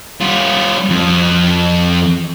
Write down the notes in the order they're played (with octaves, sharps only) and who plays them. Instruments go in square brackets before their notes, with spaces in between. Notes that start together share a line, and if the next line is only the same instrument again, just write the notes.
[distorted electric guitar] G3 F4
F2